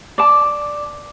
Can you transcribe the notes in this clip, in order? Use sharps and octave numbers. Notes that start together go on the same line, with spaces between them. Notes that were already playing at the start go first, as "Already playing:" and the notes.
D5 A5 D6